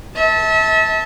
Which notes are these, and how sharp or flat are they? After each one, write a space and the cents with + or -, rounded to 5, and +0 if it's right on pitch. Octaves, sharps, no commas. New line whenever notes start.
E5 -35 A5 +0